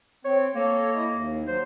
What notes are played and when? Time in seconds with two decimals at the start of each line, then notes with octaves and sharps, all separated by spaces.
0.25 C4 C#5
0.55 A#3 A4 C#5
0.94 E4 D#5
1.10 D#2
1.47 F#3 C5